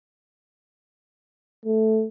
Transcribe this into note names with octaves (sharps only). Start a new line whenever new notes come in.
A3